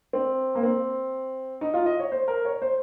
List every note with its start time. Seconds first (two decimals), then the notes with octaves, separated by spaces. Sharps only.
0.13 C4
0.55 A#3
0.63 C4
1.61 D#4
1.74 F4
1.86 D#5
2.00 C#5
2.12 C5
2.28 A#4
2.45 C#5
2.62 C5